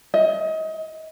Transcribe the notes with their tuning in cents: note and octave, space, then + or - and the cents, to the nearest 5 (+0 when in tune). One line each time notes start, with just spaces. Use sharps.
D#5 +30